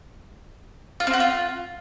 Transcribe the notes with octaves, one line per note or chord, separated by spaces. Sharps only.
F4
C4
F#4
F4